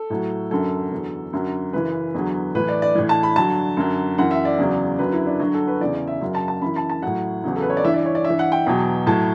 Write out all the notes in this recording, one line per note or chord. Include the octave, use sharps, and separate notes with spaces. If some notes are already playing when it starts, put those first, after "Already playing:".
Already playing: A4
A2 F#3
F#2 D3 F#3 A4
E2 D3 F#3
F#2 D3 F#3
F#2 C#3 E3 B4
E2 D3 F#3
A2 E3 B4
D5
D5
A2 E3
A5
B5
G2 D3 F#3 A5
F#2 D3 F#3
F#2 E3 F#5
E5
D5
E2 C#3 F#3
F#2 D3 F#3 B4
E4
D4
G2 D3 F#3 F#4
A4
B4
E2 C#3 E3 D5
D5
E5
F#2 C#3 F#3
A5
A5
F#2 E3 B5
A5
A5
A2 F#3 F#5
E2 C#3 F#3
A4
B4
C#5
D5
G2 E3 E5
D5
C#5
D5
G2 E5
E3
F#5
G5
E2 B2 F#3
A2 F#3 A5